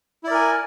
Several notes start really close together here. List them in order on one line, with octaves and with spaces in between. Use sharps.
E4 D5 A#4 G#5